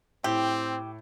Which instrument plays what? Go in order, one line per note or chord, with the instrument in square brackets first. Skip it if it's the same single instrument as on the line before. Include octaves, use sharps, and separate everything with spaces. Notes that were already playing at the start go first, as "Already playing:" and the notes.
[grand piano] A2 [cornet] C4 [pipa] G4